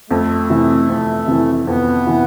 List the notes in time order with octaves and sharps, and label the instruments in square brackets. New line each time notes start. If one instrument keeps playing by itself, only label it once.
[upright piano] F2 [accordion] A3
[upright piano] C3 E3
F2
C3 E3
[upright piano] F2 [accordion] B3
[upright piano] C3 E3